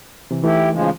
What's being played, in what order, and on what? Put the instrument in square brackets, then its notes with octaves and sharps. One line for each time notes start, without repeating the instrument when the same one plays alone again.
[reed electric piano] C3 E3
[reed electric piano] E3 A3 D#4 [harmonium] E4 G4
[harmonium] C#3 F3 G#3